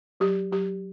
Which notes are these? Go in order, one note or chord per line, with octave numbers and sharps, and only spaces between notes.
F#3 G4
F#3 G4